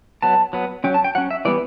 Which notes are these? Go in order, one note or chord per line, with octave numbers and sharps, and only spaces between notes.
F#3 B3 A5
F#3 B3
F#3 C#4 G5
A5
G5
F#3 C#4 F#5
E5
E3 G3 B3 D5